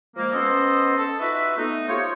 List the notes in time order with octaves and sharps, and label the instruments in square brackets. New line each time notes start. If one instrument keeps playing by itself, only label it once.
[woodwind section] F3 G#3 A#3
B3 C#4 A4 C5 D#5
A4
D#4 F4 F#4 B4 E5
A3 B3 D#4
F4 G4 C5 C#5